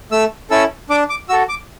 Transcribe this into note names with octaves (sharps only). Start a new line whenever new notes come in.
A3 E6
C#4 E4 A4 E6
D4 D6
D6
F#4 A4 E6
D6